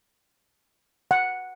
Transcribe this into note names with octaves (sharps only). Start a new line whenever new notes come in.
F#5